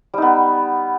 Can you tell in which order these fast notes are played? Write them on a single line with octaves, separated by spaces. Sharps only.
G3 D#4 B3